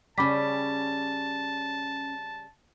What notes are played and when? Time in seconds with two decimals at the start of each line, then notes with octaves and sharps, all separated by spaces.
0.18 C#3 G3 C#4 G5 A5 B5 D6 B6